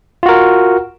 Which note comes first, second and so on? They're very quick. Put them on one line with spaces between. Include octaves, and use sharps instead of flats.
F4 F#4 A#4